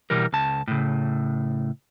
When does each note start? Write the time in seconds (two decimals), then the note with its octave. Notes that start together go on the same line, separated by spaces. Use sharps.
0.10 B2 E3 G3 A#4
0.33 C#2 A5
0.68 A2 C#3